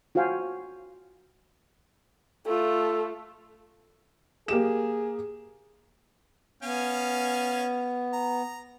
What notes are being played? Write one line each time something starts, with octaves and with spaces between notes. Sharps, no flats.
F4 F#4 C5 F5 G5 G#5
A3 F4 A4
A#3 G4 G#4 E7
B3 C#4 F5 G#5
A#5